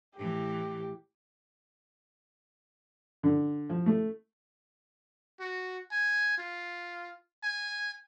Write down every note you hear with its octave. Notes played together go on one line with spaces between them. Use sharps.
A2 E3 G4
D3
F3
A3
F#4
G#5
F4
G#5